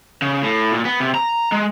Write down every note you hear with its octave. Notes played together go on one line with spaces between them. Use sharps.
C#3
A2
A#2
B3
C3
A#5
G#3